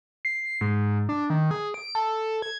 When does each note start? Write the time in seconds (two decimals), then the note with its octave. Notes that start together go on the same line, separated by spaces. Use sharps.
0.25 C7
0.61 G#2
1.09 D4
1.30 D#3
1.51 G#4
1.74 D7
1.95 A4
2.42 G#6